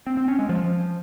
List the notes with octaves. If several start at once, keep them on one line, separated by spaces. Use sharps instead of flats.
C4
C4
C#4
G#3
F3